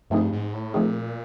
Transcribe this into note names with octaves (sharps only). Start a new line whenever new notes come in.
G2 F3 A3 C4 D#4 G#4
G#2
A2
A#2 F3 A3 C4 D#4 G#4